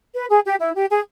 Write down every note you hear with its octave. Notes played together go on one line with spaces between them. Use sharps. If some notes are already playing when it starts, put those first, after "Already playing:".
B4
G#4
G4
E4
G4
G#4